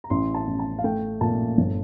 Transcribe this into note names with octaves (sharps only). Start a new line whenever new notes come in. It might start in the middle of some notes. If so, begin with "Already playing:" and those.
A#5
A1 C6
A5
A1
A5
F5
A3 G5
A#2 A5
G1